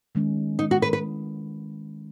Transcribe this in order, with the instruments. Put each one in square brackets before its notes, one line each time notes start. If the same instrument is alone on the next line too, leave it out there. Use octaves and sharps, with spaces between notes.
[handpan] D#3 G#3 C#4
[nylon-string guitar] D#4
F#4
B4
B4